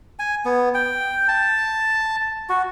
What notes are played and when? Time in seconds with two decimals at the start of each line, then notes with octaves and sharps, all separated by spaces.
0.19 G#5
0.45 B3
0.74 G5
1.28 A5
2.49 F#4